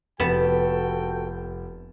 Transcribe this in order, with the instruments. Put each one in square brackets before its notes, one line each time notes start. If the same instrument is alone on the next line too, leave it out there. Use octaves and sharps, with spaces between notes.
[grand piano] F1 A6 E7 [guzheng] B3 [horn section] F#4 A4 G5